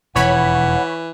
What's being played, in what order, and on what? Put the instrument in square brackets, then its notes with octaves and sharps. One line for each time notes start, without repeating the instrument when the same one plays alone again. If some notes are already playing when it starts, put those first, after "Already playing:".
[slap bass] E1 F2 [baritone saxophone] E3 [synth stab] C#5 B5 [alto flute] F#5